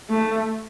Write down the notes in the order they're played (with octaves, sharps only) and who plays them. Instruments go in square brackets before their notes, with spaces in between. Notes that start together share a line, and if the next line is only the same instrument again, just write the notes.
[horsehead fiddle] A3